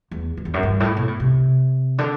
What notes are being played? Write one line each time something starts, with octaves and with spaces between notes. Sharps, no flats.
E2
F#2
E2
F#2
G2
A2
B2
A2
C3
D3